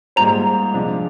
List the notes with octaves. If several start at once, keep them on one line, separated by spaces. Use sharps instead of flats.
G#2 G3 A#3 F4 C5 A#5
C3 F3 G#3 D4